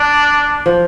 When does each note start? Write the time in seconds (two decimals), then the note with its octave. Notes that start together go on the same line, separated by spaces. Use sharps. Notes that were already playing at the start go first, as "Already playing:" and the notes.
Already playing: D4
0.66 F3